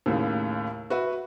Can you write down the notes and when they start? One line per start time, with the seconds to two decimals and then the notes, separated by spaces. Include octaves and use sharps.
0.06 D#2 A2 C#3
0.90 F#4 B4 E5